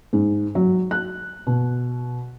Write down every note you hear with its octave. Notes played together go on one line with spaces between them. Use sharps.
G#2
F#3
F#6
B2